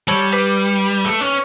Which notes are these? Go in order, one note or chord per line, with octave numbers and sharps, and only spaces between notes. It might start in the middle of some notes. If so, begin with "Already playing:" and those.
G3 A4 C#5
B4 D5
A3
C#4